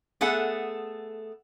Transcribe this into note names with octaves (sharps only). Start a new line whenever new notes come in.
A3 B3 G#4 A4 F#5